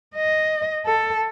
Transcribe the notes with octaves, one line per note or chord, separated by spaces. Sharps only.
D#5
A4